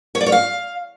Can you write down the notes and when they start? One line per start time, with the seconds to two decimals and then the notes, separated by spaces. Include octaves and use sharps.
0.15 C#5
0.21 D5
0.26 C#5
0.32 F5